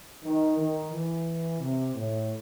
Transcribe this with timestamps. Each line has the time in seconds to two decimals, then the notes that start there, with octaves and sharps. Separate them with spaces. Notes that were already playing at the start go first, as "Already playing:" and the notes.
0.23 D#3
0.57 D#3
0.91 E3
1.59 C3
1.94 A2